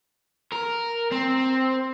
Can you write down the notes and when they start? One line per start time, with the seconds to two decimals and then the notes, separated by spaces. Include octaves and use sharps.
0.52 A#4
1.12 C4